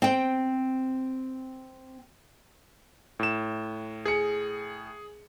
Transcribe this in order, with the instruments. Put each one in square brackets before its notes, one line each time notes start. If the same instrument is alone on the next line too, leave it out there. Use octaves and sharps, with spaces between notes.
[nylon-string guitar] C4 G5
[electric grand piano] A2 E7
[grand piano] G#4 C#7